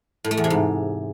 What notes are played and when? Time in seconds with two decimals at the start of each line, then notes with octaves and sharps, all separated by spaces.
0.24 A2
0.31 A3
0.37 E2
0.44 C3
0.50 G#2